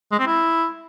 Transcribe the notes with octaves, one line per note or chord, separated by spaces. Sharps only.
G#3
C4
E4